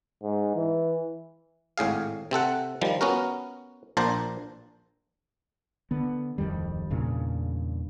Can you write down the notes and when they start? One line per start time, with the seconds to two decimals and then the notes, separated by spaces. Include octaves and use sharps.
0.23 G#2
0.56 E3
1.78 G#1 A2 G#4 F5
2.31 C3 C4 A4 F#5
2.81 D#3 F3 G3
3.01 B3 C#4 F#4 A#4
3.97 A#1 A#2 D4 C5 A5 A#5
5.91 D3 B3
6.38 D1 F2 D#3 G3
6.91 E2 G2 A#2 C#3